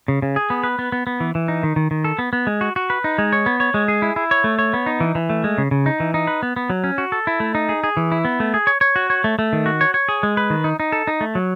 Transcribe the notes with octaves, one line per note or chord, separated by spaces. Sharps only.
C#3
C#3
G#4
B3
B4
B3
B3
B3
E3
E3
D#4
D#3
D#3
D#3
A4
B3
B3
G#3
F#4
F#4
B4
D#4
G#3
C#5
B3
C#5
G#3
G#4
E4
E4
C#5
A3
C#5
B3
D#4
E3
E3
A3
G#3
C#3
C#3
D#4
E3
D#4
B4
B3
B3
F#3
C#4
F#4
A4
E4
A3
D#4
G#4
G#4
E3
E4
B3
A3
G#4
C#5
C#5
F#4
C#5
A3
A3
D#3
F#4
C#5
C#5
G#4
G#3
B4
D#3
D#4
D#4
A4
D#4
A3
F#3